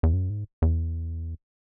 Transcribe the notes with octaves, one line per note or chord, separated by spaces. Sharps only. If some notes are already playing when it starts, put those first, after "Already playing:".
E2
F#2
G#2
E2